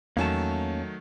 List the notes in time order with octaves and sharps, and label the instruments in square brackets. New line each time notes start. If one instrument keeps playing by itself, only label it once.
[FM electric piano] E2 [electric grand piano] D#3 F#3 A3 [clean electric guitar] A#3 C#4 A5